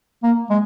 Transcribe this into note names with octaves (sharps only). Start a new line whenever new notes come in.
A#3
G#3